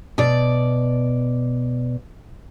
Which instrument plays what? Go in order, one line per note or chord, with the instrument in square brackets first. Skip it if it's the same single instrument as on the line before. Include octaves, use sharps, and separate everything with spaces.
[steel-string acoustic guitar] B2 D5